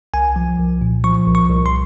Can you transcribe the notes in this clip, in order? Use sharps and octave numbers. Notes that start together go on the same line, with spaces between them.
C2 G#5
F3
C2
A#2
F3 C#6
C2
C#6
C2
C6